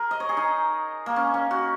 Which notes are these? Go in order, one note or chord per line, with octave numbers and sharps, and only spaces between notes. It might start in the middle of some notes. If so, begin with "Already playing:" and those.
Already playing: G#4 A#4
D#5
C#5
G#4
D#4
A#3
C#4
C#4
F#4